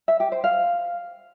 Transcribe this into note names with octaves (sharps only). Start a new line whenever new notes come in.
E5
G4
C5
F5